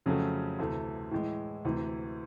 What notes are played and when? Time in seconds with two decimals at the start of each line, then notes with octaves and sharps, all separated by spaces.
0.06 F2 C#3 F#3 A3 C#4
0.59 D2 C3 E3 A3
1.11 A2 E3 G#3
1.65 D2 C3 E3